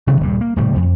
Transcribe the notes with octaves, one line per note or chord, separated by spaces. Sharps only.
C3 D#3 F#3 B3
D#1 G2 G3
A#3
D#1 A2 C#3 G3
F2